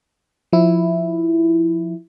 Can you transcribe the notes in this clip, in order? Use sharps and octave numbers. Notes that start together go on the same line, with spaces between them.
F3 E4